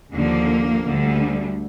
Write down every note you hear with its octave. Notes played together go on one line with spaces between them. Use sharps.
D#2 D3 F3 A#3
D2 D3 G3